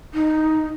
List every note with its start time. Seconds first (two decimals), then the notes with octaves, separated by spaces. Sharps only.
0.14 D#4